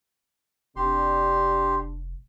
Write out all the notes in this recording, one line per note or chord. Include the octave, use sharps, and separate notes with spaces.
F1 C3 D4 G4 C6